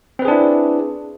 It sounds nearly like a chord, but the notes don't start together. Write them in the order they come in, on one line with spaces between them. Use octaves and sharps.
C4 B4 G#4 D4 E4